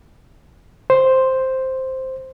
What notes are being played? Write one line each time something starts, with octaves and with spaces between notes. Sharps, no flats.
C5